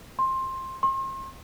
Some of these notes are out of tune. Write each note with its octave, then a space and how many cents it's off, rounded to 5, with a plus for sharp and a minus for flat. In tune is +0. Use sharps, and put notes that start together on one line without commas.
C6 +15
C6 +40